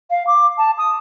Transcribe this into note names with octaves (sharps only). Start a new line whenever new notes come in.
F5
D6
A5
D#6